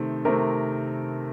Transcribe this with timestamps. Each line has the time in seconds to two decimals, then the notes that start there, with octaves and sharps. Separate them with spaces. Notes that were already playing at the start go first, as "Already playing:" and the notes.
Already playing: C3 D#3 A3 C4
0.25 C3 D#3 A3 C4 A#4